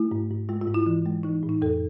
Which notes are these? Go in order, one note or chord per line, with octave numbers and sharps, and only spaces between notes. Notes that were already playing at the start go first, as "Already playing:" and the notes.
Already playing: A3 E4
G#2
G#2
G#3 F4
F4
G#2
E4
E3
G#3
E3 D#4
A2
D#4
F2 A4